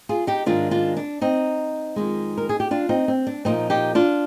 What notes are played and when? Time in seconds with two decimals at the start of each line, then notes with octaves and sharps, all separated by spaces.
0.09 F4 G#4
0.27 D#4 G4
0.46 G#2 D#3 G#3 D4 F4
0.71 D4 F4
0.97 D4
1.21 C4 D#4
1.96 F2 D#3 G#3
2.37 A#4
2.49 G#4
2.60 G4
2.71 D4 F4
2.89 C4 D#4
3.08 C4
3.27 D4
3.45 A#2 F3 A#3 C4 D#4
3.70 D#4 G4
3.95 D4 F4